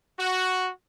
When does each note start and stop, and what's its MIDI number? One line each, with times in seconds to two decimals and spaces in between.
0.18 0.70 66